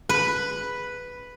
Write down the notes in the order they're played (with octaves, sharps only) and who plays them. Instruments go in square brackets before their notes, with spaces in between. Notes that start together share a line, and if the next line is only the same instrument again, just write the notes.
[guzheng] B4